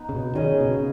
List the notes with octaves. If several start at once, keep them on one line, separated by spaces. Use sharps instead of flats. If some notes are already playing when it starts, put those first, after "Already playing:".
Already playing: B3 D#4
C#3
B2
D#3 C#4 G#4 D#5
C#3
B2
C#3